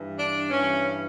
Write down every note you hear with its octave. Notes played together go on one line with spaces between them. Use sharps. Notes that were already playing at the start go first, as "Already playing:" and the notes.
Already playing: G2 E3
D4
G2 E3 C#4